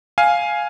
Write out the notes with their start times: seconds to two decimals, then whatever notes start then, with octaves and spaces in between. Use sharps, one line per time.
0.18 F5 G#5